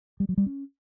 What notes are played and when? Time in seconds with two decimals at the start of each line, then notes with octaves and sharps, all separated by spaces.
0.20 G3
0.29 F#3
0.38 G3
0.46 C#4